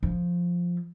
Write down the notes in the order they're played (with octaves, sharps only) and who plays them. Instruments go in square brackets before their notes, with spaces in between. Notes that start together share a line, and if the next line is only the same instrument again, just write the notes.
[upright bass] F3